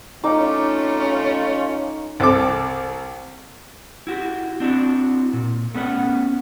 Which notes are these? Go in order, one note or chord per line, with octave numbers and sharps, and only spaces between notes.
A3 C#4 D#4 F4 D6
C2 C4 A4 D6
E4 F#4 G4
C4 D4 E4 F#4
A#2
A3 B3 C#4 D5 F#5